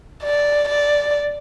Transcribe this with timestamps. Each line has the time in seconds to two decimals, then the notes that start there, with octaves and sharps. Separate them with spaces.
0.23 D5
0.69 D5